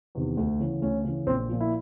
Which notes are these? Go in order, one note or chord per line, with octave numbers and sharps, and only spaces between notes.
E2 C3 D#3
D2
C#3 E3
D2 C#4
C#3 E3
A#1 C4
A#2 F3
E4